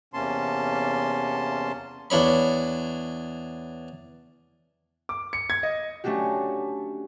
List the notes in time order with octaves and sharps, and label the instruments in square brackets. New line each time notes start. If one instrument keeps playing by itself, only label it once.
[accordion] E2 C3 A#3 C#4 A5 C6
[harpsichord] E2 D4 C#5 B5
[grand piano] D6
C#7
G#6
D#5
[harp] A3 C#4 D4 F#4 G4